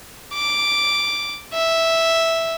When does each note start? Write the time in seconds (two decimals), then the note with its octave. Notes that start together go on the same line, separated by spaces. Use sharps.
0.34 D6
1.54 E5